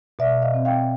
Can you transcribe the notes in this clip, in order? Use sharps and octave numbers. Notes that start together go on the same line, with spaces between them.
B2 D5 E5
D#5 F5
C4
F5 G5